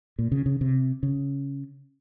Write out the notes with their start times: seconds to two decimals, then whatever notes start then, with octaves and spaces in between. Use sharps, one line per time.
0.19 A#2
0.32 C#3
0.46 C#3
0.61 C3
1.03 C#3